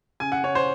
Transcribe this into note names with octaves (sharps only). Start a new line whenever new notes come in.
C#3 G#5
F#5
C#3 C#5
C5